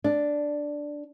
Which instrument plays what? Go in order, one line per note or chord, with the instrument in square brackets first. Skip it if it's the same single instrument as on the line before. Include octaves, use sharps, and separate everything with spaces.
[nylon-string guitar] D4